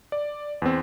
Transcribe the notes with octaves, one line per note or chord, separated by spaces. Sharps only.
D5
E2 C4